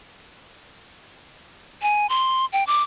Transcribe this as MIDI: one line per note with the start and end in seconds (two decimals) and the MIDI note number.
1.82 2.07 80
2.09 2.46 84
2.53 2.65 79
2.67 2.83 86